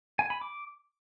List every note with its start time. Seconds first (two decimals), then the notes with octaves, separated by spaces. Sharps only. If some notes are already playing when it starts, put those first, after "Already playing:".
0.19 G#5
0.30 B5
0.41 D6